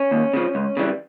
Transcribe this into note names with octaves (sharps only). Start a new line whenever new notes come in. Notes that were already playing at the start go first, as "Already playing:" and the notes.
Already playing: C#4
D#2
C#3 F3
C#2
C#3 E3 G3